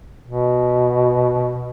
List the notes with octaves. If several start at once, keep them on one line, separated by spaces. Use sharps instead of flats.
B2